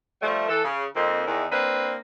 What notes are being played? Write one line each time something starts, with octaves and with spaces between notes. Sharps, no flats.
F3 G3 A3
E3 A4
C#3
F2 A#3 C4 D#4
E2 D#3
A#3 C4 D4 B4